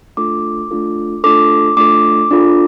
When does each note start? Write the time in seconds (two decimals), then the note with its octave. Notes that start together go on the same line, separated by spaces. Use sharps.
0.17 A3 D4 F4 A4 D6
0.71 A3 D4 F4 A4
1.24 A3 D4 F4 A4 D6
1.77 A3 D4 F4 A4 D6
2.31 D4 F4 A4